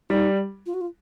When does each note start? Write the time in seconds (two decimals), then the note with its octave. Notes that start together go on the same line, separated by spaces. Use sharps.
0.10 G3 D#4
0.66 F4
0.74 F#4
0.81 F4